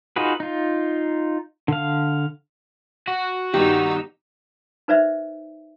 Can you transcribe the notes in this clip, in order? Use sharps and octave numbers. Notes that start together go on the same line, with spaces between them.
D#4 F4 F#4 G#4 B4
D#4 F4
D3 F5
F#4
G2 D#3 B3 D#4 G4 E6
D#4 B4 C5 D5 E5